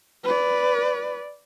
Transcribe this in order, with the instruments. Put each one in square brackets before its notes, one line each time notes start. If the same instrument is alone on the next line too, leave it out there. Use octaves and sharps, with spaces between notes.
[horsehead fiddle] B4 D5